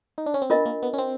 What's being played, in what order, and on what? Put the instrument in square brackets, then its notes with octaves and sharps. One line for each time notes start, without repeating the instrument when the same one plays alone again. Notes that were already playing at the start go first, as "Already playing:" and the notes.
[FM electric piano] D#4
D4
C#4
C4
[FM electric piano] B3 [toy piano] D4 F4 A#4 D#5
[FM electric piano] A#3
B3
C#4
C4